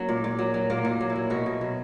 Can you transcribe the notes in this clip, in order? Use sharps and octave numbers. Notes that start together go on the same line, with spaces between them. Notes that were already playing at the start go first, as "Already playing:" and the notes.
Already playing: F#3 A#3 C#4
A#2
A#2
F#3
F#3
A#2 A#3
A#2
F#3
E4
F#3
B2 F#4
B2
F#3